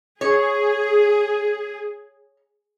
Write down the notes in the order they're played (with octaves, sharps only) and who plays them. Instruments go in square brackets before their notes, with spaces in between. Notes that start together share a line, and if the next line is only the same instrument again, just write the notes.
[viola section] G#4 [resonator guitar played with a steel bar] C#5